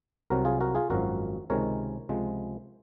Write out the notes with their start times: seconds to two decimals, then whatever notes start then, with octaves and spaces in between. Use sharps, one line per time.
0.30 C2 C3 F#3 F#4 A#4
0.45 F4 G#4
0.61 F#4 A#4
0.75 F4 G#4
0.90 G#1 F#2 F3 F#4 A#4
1.50 C#2 C3 D#3 G#3 A#4 C#5
2.09 C#2 C3 F3 G#3